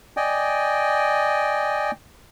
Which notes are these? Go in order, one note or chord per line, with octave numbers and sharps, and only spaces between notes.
D5 D#5 G5 G#5